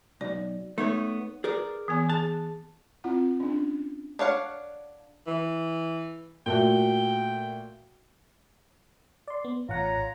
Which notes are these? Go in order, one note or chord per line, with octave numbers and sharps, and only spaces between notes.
B1 D5
A3 B3 D#4 C#5
G#4 A#4 B4 D5
E3 B3 G#5
G#4 A5
C4 E4 F4 F#5
C#4 D4
D4 C#5 F5 F#5
E3
A#2 A3 F#4 G5
D5 C6
B3
A1 F4 C#5 F#5 A#5